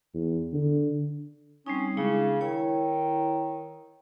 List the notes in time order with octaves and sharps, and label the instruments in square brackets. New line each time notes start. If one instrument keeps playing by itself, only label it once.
[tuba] E2
D3
[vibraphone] G3 C4 D#4 [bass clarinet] C#4
[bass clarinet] C#3 [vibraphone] G#3 D4 E4
[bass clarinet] D#3 [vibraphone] E4 C#5